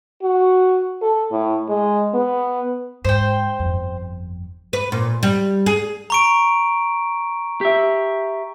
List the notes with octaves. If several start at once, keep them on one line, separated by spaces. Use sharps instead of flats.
F#4
A4
A2
G#3
B3
G#2 C5 G5
G1 F2
B4
A#2
G3
G#4
A#5 C#6 D7
G4 E5